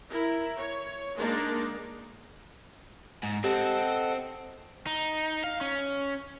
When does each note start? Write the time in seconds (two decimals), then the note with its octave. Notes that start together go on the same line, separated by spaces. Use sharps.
0.11 E4 A#4
0.57 C#5
1.17 G#3 A#3 D4 D#4 A#4 D5
3.23 G#2
3.44 C4 G4 A4 D#5 F#5
4.87 D#4
5.44 F5
5.61 C#4